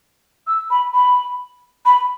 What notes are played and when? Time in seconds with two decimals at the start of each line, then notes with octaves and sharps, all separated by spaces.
0.47 E6
0.70 B5
0.94 B5
1.85 B5